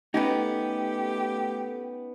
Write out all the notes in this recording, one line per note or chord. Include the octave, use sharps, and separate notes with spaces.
A3 B3 C#4 D#4 G4